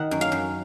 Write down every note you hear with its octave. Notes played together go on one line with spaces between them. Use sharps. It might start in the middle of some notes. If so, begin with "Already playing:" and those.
Already playing: D#3 F#5
F#2
F5
F#2